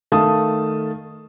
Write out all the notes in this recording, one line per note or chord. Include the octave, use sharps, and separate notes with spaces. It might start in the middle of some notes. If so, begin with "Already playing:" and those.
D#3 A3 F5 A5 D#6